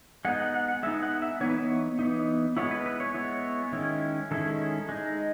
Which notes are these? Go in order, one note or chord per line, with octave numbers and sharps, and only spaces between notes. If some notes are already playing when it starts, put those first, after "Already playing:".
G#3 B3 D#4 F#5
F#5
F#5
F#5
G#3 B3 D#4 E5
F#5
E5
E3 B3 D#4 C#5
B4
C#5
E3 B3 D#4
G#3 B3 E4 C#5
B4
B4
C#5
G#3 B3 E4 C#5
D#3 G#3 C#4 E4
D#3 G#3 C#4 E4 A4
G#3 D#4